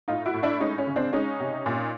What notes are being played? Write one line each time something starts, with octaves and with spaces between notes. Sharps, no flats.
A2 D#4 F4
E4 F#4
A2
D4 E4
G#3 C#4 D#4
C#4
C#3
C4 D4
G#3 C#4 D#4
C3
A#2